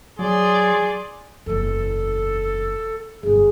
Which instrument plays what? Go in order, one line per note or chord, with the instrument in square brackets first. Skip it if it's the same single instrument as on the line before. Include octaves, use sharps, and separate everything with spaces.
[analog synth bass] F#3 [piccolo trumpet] G#4 [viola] D5 C6
[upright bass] F#1 E2 [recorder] A4
[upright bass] G1 F#2 [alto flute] G#4